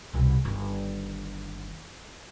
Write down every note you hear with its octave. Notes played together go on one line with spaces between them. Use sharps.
C2 B2
G1 D#3